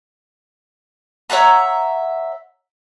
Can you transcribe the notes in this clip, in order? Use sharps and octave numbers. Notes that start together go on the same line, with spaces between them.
C#5 E5 F#5 A#5